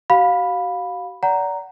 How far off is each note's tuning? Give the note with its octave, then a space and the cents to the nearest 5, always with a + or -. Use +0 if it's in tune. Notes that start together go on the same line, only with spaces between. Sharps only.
F#4 +40 F5 +20 B5 +0
D5 -30 F#5 +15 A#5 +0